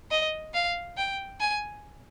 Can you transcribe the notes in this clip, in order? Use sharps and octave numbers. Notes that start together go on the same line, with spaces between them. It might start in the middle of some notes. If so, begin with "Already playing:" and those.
D#5
F5
G5
G#5